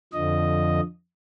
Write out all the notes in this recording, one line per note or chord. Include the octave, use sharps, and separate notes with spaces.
F2 D3 F3 D#5